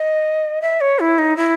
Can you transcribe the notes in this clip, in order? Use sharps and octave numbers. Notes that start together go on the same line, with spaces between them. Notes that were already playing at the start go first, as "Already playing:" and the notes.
Already playing: D#5
E5
C#5
E4
D#4
E4